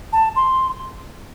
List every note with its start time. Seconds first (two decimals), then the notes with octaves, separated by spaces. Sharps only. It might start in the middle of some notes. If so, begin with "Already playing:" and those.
0.13 A5
0.36 C6